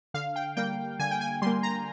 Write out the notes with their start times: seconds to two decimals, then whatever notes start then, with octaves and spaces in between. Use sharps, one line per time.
0.14 D3 F5
0.36 G5
0.57 G3 A#3 G5
0.99 D3 G#5
1.11 G5
1.21 G#5
1.42 G3 A#3 C6
1.63 A#5